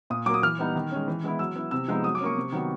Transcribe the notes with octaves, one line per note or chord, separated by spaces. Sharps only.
A#2 D#6
F#3 A#3 D6
D#6
E3 F6
G3 B3 D#4
D#3
G#3 C#4
E3
G#3 B3 E4
F#3 E6
B3 E4
C3 E6
F3 G#3 B3 D#4
F#3 D#6
D6
A#3 C#4 C#6
C3
D#3 F#3 B3